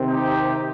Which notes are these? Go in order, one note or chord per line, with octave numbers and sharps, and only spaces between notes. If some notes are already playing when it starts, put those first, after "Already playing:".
Already playing: C3 D#3 C4
D#4 G4